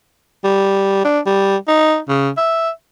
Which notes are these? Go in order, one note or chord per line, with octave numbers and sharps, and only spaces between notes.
G3
D4
G3
D#4
C#3
E5